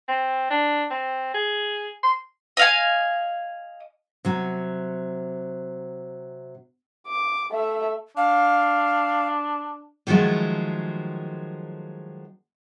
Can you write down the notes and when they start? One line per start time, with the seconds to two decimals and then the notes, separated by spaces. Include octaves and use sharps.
0.08 C4
0.50 D4
0.91 C4
1.34 G#4
2.03 C6
2.57 D#5 F5 G#5
4.25 C3 F#3
7.07 D6
7.51 A3 E5
8.17 D4 F5
10.07 D3 D#3 F3 F#3 G#3 A3